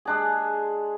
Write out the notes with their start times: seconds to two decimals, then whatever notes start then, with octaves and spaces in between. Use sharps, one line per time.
0.05 G#3 D4 G#4